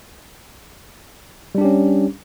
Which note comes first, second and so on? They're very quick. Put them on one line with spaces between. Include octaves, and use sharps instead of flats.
G3 D4 G4 C#4